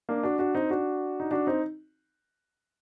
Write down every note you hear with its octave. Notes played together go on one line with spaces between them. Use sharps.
A#3 D4
D4 F#4
D4 F#4
C4 D#4
D4 F#4
D#4
D4 F#4
C4 D#4